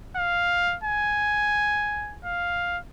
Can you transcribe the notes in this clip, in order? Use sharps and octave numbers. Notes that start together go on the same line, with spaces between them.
F5
G#5
F5